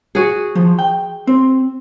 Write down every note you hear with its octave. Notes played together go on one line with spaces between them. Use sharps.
F#4 G#4
F3
G5
C4